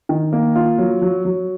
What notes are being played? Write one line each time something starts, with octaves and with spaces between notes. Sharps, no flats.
D#3
A#3
F4
F#3
F#3
F#3